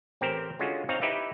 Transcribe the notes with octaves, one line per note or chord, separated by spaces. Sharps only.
A1 C4 G4 A#4 C5
D3 G#3 C#4 F4 F#4
C4 D#4 C#5 F5 A#5
D#4 E4 G4 B4 D5 E5